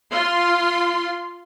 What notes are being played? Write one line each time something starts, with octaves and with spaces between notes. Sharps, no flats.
F4 C6